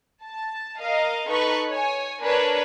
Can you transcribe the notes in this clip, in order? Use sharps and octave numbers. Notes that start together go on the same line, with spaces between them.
A5
A#4 D#5 F5
D#4 A4 B4 C#6
C#5 G#5
D4 A#4 B4 C#5